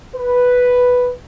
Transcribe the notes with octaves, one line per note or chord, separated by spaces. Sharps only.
B4